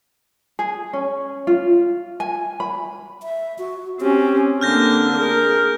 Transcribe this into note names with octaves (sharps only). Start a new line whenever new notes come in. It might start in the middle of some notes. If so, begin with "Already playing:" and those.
G#4
C#4
F4
G#5
B5
E5
F#4
C4 C#4 G4
D3 A#3 C4 F6 G6 A#6
G#4 A#4